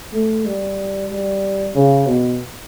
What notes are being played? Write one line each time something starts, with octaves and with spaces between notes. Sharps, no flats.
A3
G3
G3
C#3
B2